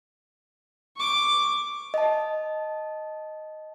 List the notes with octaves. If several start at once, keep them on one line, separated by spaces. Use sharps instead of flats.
C#6 D6
D#5 A5